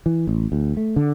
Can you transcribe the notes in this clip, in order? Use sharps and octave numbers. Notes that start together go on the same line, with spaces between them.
E3
A1
D2
A3
D3